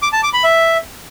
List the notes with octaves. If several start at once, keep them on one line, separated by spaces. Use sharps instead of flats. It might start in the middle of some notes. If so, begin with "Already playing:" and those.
D6
A5
D6
B5
E5